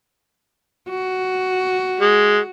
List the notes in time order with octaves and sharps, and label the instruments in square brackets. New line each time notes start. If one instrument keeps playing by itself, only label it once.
[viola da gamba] F#4
[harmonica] G#3